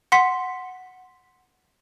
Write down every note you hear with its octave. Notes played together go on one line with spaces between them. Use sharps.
F#5 C6 B6